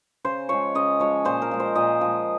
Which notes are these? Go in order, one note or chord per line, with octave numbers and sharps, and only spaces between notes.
C#3 C5
F3 G#3 C#5
C#3 D#5
F3 G#3 C#5
A#2 C5
A#4
F3 G#3
C5
A#2 D#5
F3 G#3